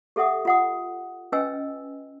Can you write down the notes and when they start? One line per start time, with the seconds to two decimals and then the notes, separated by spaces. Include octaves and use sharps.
0.16 G4 A4 E5 F#5 D#6
0.45 F4 F#5 D#6
1.32 C#4 B4 D#5 G5 G#5 E6